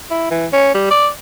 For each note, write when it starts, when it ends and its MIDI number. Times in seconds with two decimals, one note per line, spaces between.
0.11 0.26 64
0.31 0.47 52
0.53 0.74 61
0.74 0.87 55
0.91 1.08 74